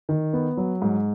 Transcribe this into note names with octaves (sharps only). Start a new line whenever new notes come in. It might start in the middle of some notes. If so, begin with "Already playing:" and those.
D#3
B3
F#3
G#2